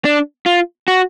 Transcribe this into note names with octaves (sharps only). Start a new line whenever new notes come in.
D4
F4
F#4